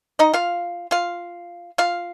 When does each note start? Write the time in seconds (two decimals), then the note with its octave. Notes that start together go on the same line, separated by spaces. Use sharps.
0.19 D#4 D#5
0.34 F4 F5
0.91 F4 F5
1.78 F4 F5